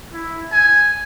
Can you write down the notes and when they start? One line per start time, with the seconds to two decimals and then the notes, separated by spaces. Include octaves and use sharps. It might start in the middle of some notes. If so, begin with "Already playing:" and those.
0.13 E4
0.52 G#5